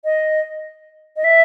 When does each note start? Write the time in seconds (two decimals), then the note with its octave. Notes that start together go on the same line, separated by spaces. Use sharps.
0.05 D#5
1.17 D#5
1.24 E5